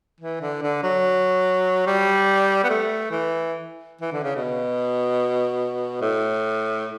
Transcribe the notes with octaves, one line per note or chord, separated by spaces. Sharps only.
E3
D3
D3
F#3
G3
B3
A3
E3
E3
D3
C#3
B2
A2